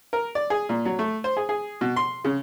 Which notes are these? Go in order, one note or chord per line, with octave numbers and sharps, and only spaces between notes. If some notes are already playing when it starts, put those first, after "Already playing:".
A#4
D5
G#4
A#2
F#3
A3
C5
G#4
G#4
B2
C6
C#3